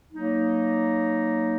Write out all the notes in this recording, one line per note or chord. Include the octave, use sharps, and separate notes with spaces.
F#3 A#3 D#4